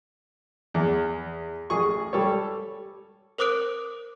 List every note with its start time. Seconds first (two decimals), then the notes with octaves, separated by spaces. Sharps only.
0.74 E2
1.70 A1 G#4 C#6
2.13 G3 A4 C#5
3.38 A#4 C5 D6 D#6 F#6 D7